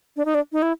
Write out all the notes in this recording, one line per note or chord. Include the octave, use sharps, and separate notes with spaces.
D4
D#4
D4
D#4
E4